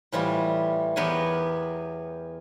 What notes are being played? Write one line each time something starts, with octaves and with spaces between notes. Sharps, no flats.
A2 E3 G3 F4
E2 B3 G4 A#4 C#5 G#5